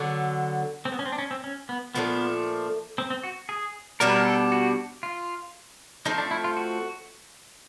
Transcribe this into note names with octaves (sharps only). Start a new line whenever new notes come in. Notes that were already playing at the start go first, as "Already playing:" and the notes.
Already playing: D3 F#3 B3
C4
B3
C#4
C4
D4
C#4
C4
C#4
B3
A#2 F3 A3 B3 D4
C4
C4
F#4
G#4
B2 G3 B3 D4 A#4
B4
A#4
A4
F#4
F4
F3 A3 C4 D#4
D4
E4
F4
F#4